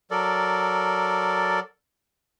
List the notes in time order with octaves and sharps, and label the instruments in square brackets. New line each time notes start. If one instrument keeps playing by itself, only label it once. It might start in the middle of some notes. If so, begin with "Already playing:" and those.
[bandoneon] F#3 A4 A#4 D5